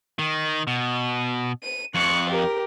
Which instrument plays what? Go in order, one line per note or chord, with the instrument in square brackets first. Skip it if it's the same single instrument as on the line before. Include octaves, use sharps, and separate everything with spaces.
[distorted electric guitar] D#3
B2
[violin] D#7
[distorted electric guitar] F2 [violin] C#6 F#6
[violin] G4 A#4